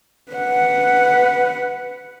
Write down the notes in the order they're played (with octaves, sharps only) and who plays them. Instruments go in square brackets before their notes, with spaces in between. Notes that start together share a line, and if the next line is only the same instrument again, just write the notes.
[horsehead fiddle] B4 F#5